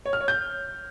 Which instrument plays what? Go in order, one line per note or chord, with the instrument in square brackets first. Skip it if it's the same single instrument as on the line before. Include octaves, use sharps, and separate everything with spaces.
[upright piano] C#5
F6
C#5
G6